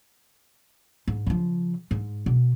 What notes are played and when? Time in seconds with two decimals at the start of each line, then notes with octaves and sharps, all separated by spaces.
1.07 G#2
1.27 C#3 F3
1.91 G#2
2.26 B2